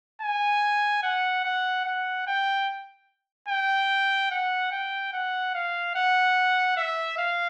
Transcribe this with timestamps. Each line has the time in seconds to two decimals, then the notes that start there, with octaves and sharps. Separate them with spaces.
0.22 G#5
1.03 F#5
1.45 F#5
1.85 F#5
2.27 G5
3.49 G5
4.31 F#5
4.72 G5
5.13 F#5
5.54 F5
5.95 F#5
6.77 E5
7.18 F5